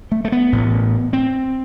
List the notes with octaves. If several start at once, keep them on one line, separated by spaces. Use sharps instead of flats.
A3
A3
B3
A1 A2
C4